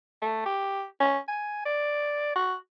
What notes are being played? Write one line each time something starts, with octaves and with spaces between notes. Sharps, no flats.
A3
G4
C#4
G#5
D5
F#4